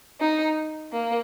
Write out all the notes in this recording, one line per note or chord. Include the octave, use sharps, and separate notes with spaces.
D#4
A#3